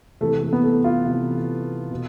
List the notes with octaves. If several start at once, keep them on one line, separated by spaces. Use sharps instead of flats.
C3 E3 A3
A3
B3
A3
F4
C3 E3
B2